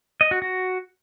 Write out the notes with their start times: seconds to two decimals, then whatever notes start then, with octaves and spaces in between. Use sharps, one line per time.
0.21 D#5
0.31 F#4
0.42 F#4